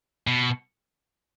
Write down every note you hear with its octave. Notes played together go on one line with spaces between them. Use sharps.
B2